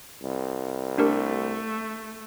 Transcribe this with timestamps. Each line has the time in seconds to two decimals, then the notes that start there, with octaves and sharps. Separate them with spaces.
0.23 C2
0.98 A3 D4 G4 A#4